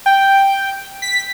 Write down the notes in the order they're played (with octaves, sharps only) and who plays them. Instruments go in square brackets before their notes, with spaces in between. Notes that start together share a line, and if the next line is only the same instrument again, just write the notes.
[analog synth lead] G5
B6